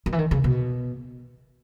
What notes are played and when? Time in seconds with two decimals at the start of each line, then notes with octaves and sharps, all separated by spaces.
0.06 D#3
0.12 E3
0.19 D#3
0.31 C#3
0.44 B2